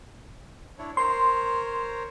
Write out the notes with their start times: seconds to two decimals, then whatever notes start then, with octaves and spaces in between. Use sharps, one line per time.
0.79 D4 E4 C#5
0.97 A#4 C5 C#5 C6